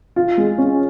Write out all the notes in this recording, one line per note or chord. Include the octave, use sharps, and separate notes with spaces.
F4
G#3
C#4